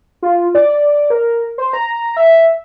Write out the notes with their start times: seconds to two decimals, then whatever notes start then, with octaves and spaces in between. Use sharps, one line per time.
0.22 F4
0.55 D5
1.10 A#4
1.58 C5
1.73 A#5
2.17 E5